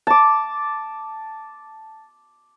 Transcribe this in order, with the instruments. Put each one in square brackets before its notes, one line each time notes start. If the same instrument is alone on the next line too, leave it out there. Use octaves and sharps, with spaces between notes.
[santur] A5 D6